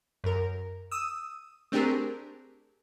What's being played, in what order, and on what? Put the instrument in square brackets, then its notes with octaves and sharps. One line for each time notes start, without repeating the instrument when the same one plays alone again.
[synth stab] F#2 A#4
D#6 E6
A3 C4 D4 G4 G#4 A#4